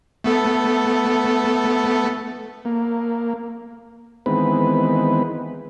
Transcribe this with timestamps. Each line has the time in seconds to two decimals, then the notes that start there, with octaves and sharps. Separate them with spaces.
0.24 A3 B3 A4
2.65 A#3
4.26 D#3 E3 G#3 B3 C4 B4